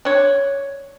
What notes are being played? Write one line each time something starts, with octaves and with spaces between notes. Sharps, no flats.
D4 C#5